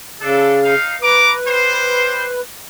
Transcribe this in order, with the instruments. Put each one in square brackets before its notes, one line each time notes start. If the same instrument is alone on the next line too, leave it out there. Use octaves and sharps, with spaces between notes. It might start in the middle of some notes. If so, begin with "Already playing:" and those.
[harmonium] C#3 [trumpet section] D4 A4
[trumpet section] D#4 F5
[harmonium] B4 [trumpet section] A#5 D6
[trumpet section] G3 C5